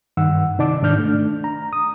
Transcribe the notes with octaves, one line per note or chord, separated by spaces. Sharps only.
G2 D#3 F#5 E6
C3 D#4 D5 A5 D6
G#2 D#3 D4 D5 F6 G6
A3 D4
A#5
D#6